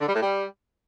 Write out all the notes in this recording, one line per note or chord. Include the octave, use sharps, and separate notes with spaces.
D3
G3
A2
G3